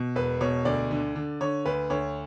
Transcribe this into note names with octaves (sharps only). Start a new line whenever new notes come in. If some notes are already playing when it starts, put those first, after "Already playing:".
Already playing: B2
E1 B4
B2 C#5
D2 D5
D3
D3
D3 C#5
D2 B4
D2 C#5